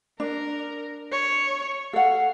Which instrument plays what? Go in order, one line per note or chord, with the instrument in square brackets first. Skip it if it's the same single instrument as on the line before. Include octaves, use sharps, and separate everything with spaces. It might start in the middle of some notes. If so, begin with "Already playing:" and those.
[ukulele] D4 [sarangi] A#4
[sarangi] C#5
[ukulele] A4 F#5 [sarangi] F5